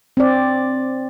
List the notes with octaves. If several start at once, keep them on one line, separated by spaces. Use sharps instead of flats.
C4 D5